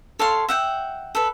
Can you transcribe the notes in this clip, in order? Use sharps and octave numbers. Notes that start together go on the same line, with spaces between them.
A4 C#5 F5 C6
E5 F#5 G5
A4 B4